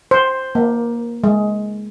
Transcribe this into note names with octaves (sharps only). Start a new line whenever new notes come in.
C5
A#3
G#3